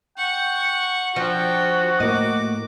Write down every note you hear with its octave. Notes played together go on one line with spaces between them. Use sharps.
F#5 G5 C#6
F3 D4 F#4 G5
A2 A#3 D#5 D6